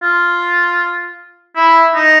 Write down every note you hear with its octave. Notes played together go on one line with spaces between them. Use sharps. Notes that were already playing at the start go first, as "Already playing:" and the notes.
F4
E4
D#4